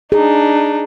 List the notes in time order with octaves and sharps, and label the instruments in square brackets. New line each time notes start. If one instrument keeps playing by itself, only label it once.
[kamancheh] D4 D#4 [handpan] G#4